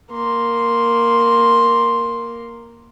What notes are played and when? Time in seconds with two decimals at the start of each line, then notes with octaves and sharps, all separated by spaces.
0.12 A#3 C6